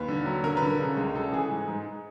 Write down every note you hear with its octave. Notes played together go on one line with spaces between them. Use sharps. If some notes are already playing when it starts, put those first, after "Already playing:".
Already playing: D#2 B4
D3
F#3
D3 A#4
B4
D3
A#4
C#3
C#2
C#3 A4
E3 G#4
G#2
G#2